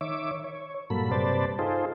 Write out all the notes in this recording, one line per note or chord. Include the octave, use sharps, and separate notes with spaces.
D#3 C#5 E5 D6
C#5
G2 A#2 F#3 A#3 A4 B5
G2 C3 B4 C5 D5 A5
D#4 F4 G#4 A4 C5